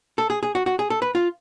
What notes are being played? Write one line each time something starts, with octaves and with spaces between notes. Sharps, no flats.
A4
G#4
G#4
F#4
F#4
G#4
A4
B4
F4